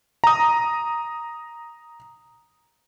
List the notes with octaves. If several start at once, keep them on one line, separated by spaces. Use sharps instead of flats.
A#5 D#6